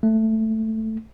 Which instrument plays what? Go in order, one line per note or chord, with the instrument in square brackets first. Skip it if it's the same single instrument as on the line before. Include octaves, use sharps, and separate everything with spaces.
[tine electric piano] A3